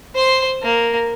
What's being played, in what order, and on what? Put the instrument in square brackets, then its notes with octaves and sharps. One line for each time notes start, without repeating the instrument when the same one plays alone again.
[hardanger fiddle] C5 C6
A#3